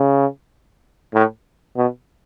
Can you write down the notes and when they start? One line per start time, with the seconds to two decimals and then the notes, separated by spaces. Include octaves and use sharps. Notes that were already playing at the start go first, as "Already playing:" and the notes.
Already playing: C#3
1.14 A2
1.76 B2